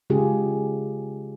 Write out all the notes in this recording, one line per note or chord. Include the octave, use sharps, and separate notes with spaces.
C#3 G#3 F4 G4 G#4